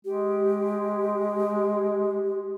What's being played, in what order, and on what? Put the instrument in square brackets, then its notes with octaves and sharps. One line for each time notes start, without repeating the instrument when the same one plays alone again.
[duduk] G#3 [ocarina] G4